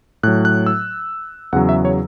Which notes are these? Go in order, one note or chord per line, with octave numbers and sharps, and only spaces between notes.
A2 F#3 F#6
F#6
E6
E2 C#3 F#3 F#5
E5
C#5